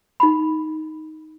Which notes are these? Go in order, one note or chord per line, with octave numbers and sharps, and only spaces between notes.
D#4 B5